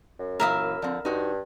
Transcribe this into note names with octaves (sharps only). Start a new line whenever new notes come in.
F#2
A#2 E3 A#4 E5 F5 D#6
D3 F3 C4
G2 D#4 F#4 C5